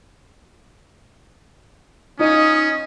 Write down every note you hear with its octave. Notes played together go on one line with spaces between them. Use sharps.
C#4 D#4 F4 D#5 D#6